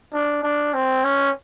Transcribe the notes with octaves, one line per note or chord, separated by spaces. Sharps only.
D4
D4
C4
C#4